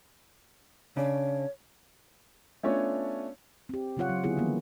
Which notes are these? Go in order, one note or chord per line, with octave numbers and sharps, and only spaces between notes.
C#3 D4 C#5
A3 B3 C#4 D4 F4 C#5
C4 G4
C#3 F#3 C4 F4 C#5 F#5
F#3
D3 B3 E4 F4 G#4
D#3 E3 G3 A#3 B3